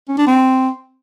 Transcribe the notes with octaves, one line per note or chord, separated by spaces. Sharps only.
C#4
D4
C4